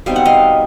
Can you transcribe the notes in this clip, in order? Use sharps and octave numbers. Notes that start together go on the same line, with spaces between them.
B2 G3 C4 D#4 F5
F#5
D#5 F5